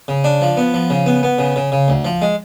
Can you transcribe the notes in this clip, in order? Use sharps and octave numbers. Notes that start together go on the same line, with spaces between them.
C#3
D4
F3
B3
F3
C#3
B3
B3
C#3
C#3
C#3
D2
F3
G#3